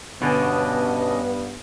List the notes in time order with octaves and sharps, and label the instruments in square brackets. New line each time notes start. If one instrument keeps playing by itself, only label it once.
[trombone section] G2 B3 [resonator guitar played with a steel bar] B2 D3 D4 [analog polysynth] C#4 D#5 [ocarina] B4